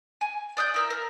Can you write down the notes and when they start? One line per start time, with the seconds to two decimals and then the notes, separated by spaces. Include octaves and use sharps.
0.21 G#5
0.57 D5 D#6 F#6 G6
0.74 E4 A#4 E6
0.90 A#4